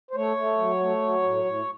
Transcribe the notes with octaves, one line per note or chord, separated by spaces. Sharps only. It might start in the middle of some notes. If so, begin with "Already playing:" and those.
C5
A3 C#5
A3
F#3
A3
F#3
A2
A2